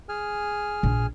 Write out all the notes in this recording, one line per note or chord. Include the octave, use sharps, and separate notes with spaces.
G#4 G#5 F6
A#1